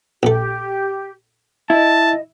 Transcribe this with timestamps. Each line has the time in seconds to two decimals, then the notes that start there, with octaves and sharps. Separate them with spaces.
0.23 A#1 A3 G4
1.70 E4 D#5 A5